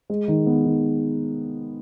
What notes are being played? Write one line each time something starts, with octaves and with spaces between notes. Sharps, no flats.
G#3
D#3
B3
D#3